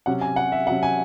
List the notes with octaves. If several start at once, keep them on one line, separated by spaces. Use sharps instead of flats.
C3 F#3 C#4 F#5
G#5
F#5
E5
C3 F#3 C#4 F#5
G#5